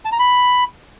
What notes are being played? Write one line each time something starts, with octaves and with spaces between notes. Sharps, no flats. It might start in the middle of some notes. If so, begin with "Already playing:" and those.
A5
A#5
B5